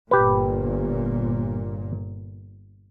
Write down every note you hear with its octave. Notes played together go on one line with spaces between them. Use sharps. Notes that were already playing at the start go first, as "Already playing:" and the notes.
G1 A#2 G4 B4